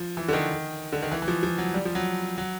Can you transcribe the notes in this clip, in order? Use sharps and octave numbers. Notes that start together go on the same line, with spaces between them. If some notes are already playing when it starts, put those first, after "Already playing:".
Already playing: F3
E3
D3
D#3
D3
D#3
E3
E3
F3
F3
F#3
G3
F3
F#3
F#3